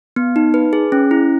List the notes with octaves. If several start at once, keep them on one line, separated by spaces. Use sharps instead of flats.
B3
D#4
B4
G#4
C#4
E4